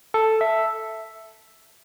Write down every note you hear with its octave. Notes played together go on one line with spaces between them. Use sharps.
A4
E5